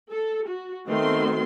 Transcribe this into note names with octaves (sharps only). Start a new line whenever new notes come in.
A4
F#4
D#3 A3 B3 C4 F#4 C6